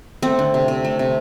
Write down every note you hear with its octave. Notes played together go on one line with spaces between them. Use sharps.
A3 C4
D3
C3
C3
A3
C3